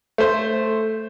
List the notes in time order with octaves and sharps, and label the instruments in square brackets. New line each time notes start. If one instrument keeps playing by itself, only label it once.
[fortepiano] A3 C5